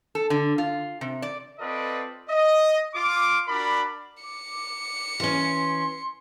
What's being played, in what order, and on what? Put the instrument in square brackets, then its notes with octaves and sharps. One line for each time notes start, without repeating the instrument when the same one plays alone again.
[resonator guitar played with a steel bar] A4
D3
F4
C3
D5
[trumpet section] C4 F4 A4 B4 D5 D#5
D#5
F4 D6
D4 F#4 A#4 D5 B5
[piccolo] D6 [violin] C#7
[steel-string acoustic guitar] E3 C#4 [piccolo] C6